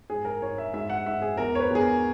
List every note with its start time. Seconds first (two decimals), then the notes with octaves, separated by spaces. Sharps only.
0.10 G#2 G#4
0.25 A#4
0.42 G#2 C#5
0.58 E5
0.73 G#2 E5
0.90 F#5
1.06 G#2 E5
1.22 G#4
1.37 E2 A#4
1.55 C#5
1.60 B4
1.70 E2 G#4
1.81 A#4